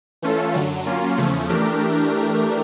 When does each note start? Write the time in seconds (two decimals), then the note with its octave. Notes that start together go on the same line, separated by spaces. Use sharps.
0.22 E3 A3 C#4 F4 A4
0.54 F#2 D3 F#3
0.86 F#3 A#3 C#4 F4
1.17 E2 C#3 F3 A3 C#4
1.49 E3 A3 D4 G4 A#4